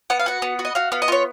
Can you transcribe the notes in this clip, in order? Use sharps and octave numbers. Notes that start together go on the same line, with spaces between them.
B3 F#5
F5
F#4 F#5
B3
F#4
D#5
F#4 F5
B3 F5
D#5
F4 C#5